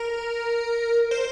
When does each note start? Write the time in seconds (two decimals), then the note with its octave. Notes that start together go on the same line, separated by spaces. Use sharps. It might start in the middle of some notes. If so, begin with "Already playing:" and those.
Already playing: A#4
1.11 C5